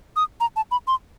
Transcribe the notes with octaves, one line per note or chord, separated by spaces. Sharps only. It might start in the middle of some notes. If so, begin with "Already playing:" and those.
D#6
A#5
A5
B5
C6